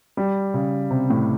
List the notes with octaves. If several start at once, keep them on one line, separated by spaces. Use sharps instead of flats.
G3
C#3
C3
A2